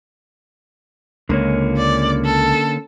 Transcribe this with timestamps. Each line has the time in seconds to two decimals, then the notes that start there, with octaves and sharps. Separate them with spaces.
1.29 C#2 D3 A#3 C#4
1.77 D5
2.25 A4